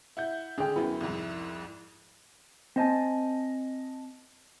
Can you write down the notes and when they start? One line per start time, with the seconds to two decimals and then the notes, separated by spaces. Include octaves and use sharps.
0.17 E4 F#5 G6
0.58 D3 G#3 D4 G#4 G5
0.76 F#2 F#3 B3 E4
1.01 C2 F2 G#2
2.76 C4 C5 D#5 G#5 A5